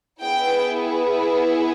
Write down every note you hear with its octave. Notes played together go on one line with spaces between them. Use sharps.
B3 E4 G#4 G5